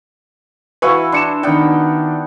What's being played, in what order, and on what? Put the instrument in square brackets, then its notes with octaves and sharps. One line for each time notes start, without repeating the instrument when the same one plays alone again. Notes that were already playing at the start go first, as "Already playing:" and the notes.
[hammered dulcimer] E3 E4 F#4 [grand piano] B4 F5 C#6
[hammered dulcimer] D4 [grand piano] C6 C#7 E7
[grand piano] D#3 D4 [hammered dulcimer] B3 F#5 G5